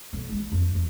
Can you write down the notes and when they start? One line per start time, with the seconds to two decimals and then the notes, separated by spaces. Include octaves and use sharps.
0.13 B1
0.29 G#3 A3
0.52 F2
0.75 E2